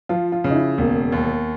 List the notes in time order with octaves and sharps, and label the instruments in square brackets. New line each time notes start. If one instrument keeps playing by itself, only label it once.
[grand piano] F3 [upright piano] F4
[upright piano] F4
[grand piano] C#3
[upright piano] D#4
E4
[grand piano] E1 [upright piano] A#3
[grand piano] D#2